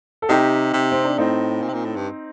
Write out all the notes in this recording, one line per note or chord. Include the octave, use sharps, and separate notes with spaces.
A4
C3 D#4 G4
C3
C4
D4
A2 C4 D#4
A#2
C3
A#2
A2
G2